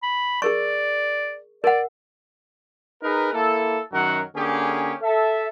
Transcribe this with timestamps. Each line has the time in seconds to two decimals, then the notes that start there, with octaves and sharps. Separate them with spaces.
0.03 B5
0.42 G#4 A#4 D5 C#6
1.64 A#4 D5 F#5
3.03 D#4 G#4 A#4 B4
3.34 A#3 E4 A4
3.93 F#2 D#3 F#3 A#4 F#5
4.35 D3 A#3 C#4 G4 G#4
5.02 A4 E5